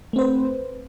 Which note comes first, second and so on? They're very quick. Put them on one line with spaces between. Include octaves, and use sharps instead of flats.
A3 C4 C5 B4